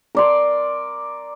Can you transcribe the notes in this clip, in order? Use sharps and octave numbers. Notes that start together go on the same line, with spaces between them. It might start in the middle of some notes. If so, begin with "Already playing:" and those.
A#4 D5 C6